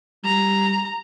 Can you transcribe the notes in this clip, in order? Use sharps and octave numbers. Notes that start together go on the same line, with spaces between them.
G3 A#5